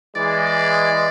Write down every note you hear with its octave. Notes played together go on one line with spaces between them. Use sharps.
E3 G#3 D5